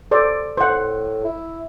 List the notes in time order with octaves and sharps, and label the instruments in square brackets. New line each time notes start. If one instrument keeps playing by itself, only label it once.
[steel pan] A4 C5 D5
[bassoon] A2 [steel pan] C5 F#5
[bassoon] E4